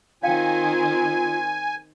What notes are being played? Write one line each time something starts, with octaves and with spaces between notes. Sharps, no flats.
D#3 C4 F4 C#5 F5 G5 G#5